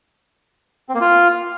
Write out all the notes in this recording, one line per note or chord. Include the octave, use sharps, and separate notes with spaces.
C4
A#3
F4